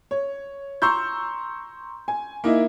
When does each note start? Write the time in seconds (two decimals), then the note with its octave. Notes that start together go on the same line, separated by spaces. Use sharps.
0.11 C#5
0.82 A#5 C6 C#6 E6 G6
2.08 G#5
2.44 A#3 D#4 E4